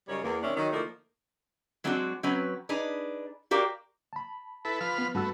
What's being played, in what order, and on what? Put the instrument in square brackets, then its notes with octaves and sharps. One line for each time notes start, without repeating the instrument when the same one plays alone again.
[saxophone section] F#2 C#3 G3 D#4 C#5
E2 A#3
C3 D#3 C#4 D4 E5
D#3 F#3
D3 F3 A3 A#3 D#4 E4
[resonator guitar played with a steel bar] F#3 G#3 C4 D4 F4 F#4
F#3 C4 C#4 B4
D4 D#4 G#4 B4
F#4 G4 A#4 D5 F5 G5
[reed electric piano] A5 B5
[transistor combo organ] E4 A4 B4
F3 B4 F6
[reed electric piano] B3
[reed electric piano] G2 F#4 E6 [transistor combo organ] A3 B3